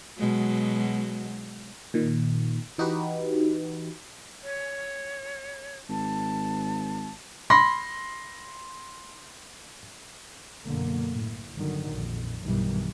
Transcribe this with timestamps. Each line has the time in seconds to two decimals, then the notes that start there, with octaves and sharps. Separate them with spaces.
0.19 B2 F#3 G#3
1.94 A#2 D#3
2.78 E3 D#4 F#4 G4 B4
4.43 C#5
5.89 G#1 A5
7.50 B5 C6 A#6
10.65 B1 F#2 B2 D3 A#3
11.11 A2
11.55 G1 D3 D#3 F#3
11.92 A#1 F2
12.42 B1 G2 B2 D#3 E3 G3